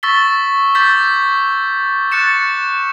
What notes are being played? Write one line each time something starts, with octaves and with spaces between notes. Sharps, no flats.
C#6 E6 A6 B6 G7
D6 E6 G6 A6 B6
C#6 F#6 A6 C#7 E7